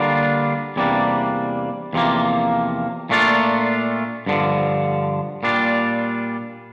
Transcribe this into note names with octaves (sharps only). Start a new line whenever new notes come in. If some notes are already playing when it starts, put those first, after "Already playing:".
Already playing: D3 G3 A#3 D4 F4
E2 C3 G3 A#3 D4
E2 C3 F3 A#3
A#2 A3 D4 F4
G2 D3 F3
A#2 G3 D4 F4